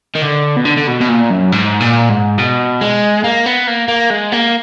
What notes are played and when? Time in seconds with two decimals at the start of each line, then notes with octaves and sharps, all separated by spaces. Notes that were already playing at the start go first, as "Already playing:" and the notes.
0.15 D#3
0.22 D3
0.57 B2
0.65 D3
0.77 D3
0.87 B2
1.00 B2
1.09 A#2
1.30 F#2
1.52 G#2
1.80 A#2
2.09 G#2
2.38 B2
2.81 G#3
3.24 A#3
3.46 B3
3.67 A#3
3.88 A#3
4.10 G#3
4.32 A#3